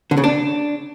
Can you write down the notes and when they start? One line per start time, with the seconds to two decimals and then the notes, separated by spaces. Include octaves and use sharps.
0.11 D3
0.17 C#3
0.24 D4